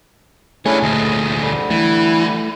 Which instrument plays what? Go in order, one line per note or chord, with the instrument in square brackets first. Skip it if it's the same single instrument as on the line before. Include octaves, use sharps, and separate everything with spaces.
[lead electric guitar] G3 C#5 [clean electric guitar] A3 G#4 [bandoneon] C#4 D4 E4
[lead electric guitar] D2 A#2 [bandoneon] D#5
[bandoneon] D3 G3
[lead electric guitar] E3 [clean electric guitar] A3